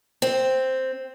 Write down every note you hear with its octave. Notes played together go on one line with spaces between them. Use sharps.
C4